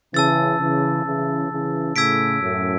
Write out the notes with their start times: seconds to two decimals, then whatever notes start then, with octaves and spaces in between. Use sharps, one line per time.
0.14 C#3 E3 A5 E6 A6
0.59 C#3 E3
1.05 C#3 E3
1.51 C#3 E3
1.96 A2 C#3 E6 G#6 B6 D7
2.42 F#2 A2